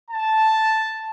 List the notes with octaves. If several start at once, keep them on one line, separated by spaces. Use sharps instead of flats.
A5